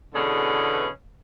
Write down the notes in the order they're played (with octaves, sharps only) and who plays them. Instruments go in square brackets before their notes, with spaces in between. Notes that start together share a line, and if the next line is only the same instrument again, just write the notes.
[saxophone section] E2 B2 D3 C#4 G#4 B4